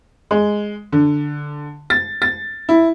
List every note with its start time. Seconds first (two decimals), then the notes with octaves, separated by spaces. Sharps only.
0.31 G#3
0.92 D3
1.90 A6
2.22 A6
2.69 E4